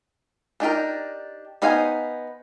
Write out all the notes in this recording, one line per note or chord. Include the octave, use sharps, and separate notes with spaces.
D4 D#4 G4 A#4
B3 D#4 C5 F5 G#5